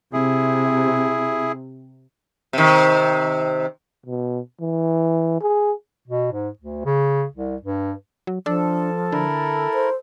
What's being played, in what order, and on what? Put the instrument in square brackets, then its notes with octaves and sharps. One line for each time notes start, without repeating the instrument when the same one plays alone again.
[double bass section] C3 [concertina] E4 G#4
[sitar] C3 D#3
[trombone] B2
E3
G#4
[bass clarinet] B2
G#2
D2
C#3
C2
G2
[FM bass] F#3
[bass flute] F3 [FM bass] D4 [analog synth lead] A4
[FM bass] D3 [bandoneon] E4 A#4
[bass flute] C5